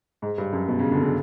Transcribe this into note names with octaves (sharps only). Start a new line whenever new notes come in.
G#2
G2
F#2
B2
C#3
D3
C#3